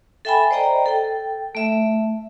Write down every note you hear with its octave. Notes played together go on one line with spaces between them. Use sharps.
A4 E5 G5 G#5 B5
C5 D5 D#5 G5 A#5
A4 G5
A3 E5